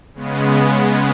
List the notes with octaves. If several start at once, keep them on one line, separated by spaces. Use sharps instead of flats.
C#3 G#3 B3